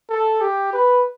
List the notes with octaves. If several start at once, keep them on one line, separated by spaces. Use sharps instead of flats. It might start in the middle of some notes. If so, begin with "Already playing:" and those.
A4
G4
B4